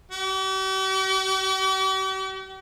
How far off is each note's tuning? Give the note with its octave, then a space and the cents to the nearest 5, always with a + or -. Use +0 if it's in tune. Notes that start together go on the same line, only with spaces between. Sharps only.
G4 -45